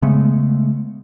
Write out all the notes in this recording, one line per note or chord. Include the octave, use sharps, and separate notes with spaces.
C#3 G#3 A3 B3